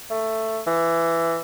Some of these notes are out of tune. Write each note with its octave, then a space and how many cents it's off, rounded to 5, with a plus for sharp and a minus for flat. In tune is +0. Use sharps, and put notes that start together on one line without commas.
A3 +10
E3 +15